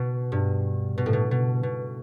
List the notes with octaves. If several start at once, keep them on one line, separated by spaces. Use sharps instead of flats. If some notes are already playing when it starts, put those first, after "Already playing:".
Already playing: B2
G2
B2
A2
B2
B2
B2